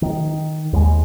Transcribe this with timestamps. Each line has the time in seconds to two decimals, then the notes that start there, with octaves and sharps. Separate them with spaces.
0.02 D#3
0.73 D#2 G3 G#3